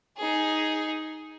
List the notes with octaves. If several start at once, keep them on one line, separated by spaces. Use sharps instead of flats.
D#4 G#4